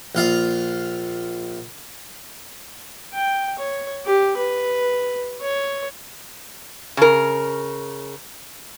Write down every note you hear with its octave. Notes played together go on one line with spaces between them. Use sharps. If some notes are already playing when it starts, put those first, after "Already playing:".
A#1 F4 F5
G5
C#5
G4
B4
C#5
C#3 A#4